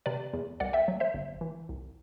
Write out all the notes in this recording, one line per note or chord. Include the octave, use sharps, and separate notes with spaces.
C3 B4 D5
E2
C2 D5 F#5
E5 G5
F#3
C5 E5
G1
E3
C2